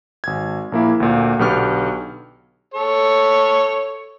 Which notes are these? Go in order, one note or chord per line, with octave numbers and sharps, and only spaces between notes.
G#1 G#6
A#1 A#3 E4
D2 A#2
B1 D3 B3 G4 C#6 F6
A4 C#5